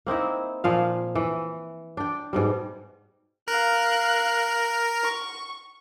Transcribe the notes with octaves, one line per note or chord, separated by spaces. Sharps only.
A#3 C4 D#4 E4
A#2 F3 F5
E3
D4 G5
G#2 B2 G3
A#4 F5 F#6
C#6